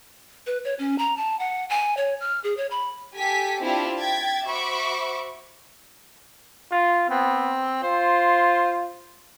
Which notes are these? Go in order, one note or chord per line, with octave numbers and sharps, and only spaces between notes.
B4
C#5
C#4
A#5
A5
F#5
G#5
C#5
F6
G#4
C#5
B5
G4 A4 G#5 B6
C4 D4 E4 F4 G4
G5 G#6 A6 B6
F#4 C5 E5 B5 C#6 D6
F4
B3 C4
F4 C5